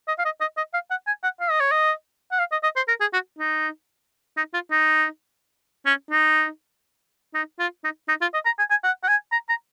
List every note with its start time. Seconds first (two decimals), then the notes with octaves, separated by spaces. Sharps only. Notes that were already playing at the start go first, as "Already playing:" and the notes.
0.08 D#5
0.19 F5
0.25 D#5
0.41 D#5
0.57 D#5
0.74 F5
0.91 F#5
1.07 G#5
1.24 F#5
1.40 F5
1.51 D#5
1.61 C#5
1.72 D#5
2.32 F#5
2.39 F5
2.52 D#5
2.63 D#5
2.76 C5
2.88 A#4
3.01 G#4
3.13 F#4
3.39 D#4
4.37 D#4
4.54 F4
4.71 D#4
5.86 C#4
6.11 D#4
7.35 D#4
7.60 F4
7.84 D#4
8.09 D#4
8.21 F4
8.34 D#5
8.46 A#5
8.59 G#5
8.70 G#5
8.84 F#5
9.04 F#5
9.08 G#5
9.32 A#5
9.49 A#5